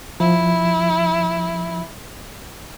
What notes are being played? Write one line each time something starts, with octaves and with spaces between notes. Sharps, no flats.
F3 E4